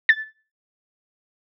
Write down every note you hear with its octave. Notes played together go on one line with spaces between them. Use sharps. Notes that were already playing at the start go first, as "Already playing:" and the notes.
A6